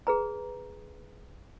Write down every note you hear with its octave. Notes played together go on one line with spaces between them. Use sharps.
G#4 B4 A#5